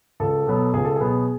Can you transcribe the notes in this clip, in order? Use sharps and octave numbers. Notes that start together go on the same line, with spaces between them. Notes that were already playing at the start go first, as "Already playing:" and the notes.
C#2 A4
B2 F#3 B3
C#2 G#4
A4
B2 F#3 B3 G#4